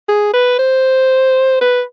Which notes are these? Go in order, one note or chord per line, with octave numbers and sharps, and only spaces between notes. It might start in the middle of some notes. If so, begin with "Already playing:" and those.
G#4
B4
C5
B4